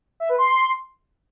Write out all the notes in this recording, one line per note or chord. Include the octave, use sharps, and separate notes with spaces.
E5
B4
C6